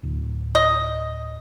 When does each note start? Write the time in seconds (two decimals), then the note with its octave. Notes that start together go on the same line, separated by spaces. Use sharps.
0.03 D1
0.55 D#5